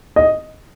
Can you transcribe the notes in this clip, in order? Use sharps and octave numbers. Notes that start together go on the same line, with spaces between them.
D#5